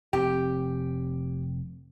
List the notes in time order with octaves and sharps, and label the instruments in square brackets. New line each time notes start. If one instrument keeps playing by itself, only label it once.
[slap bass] F1 C4 [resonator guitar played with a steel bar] G4